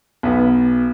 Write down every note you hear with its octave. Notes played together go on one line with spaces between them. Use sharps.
B1 B3